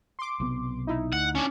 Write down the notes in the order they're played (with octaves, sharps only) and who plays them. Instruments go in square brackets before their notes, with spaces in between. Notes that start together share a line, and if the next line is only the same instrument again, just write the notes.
[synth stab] C6 D6
[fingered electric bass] B1 C3 B3
[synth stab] D#4 E4
[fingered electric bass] D2 [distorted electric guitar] F#5
[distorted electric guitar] C#4 D4